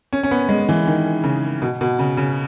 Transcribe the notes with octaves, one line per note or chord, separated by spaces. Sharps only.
C#4
C#4
B3
G#3
E3
D#3
C#3
B2
B2
C#3
C#3